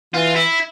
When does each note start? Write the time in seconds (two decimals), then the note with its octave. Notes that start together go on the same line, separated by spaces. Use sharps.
0.14 E3 F4
0.36 E4